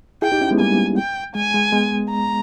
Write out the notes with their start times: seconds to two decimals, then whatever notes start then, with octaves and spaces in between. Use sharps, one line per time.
0.22 E4 G#4 G5
0.32 D#4 G4
0.41 C#4 E4
0.51 G#3 B3
0.60 G3 A#3 G#5
0.98 G5
1.35 G#3 G#5
1.54 G#3
1.72 G#3 B3
2.10 A#5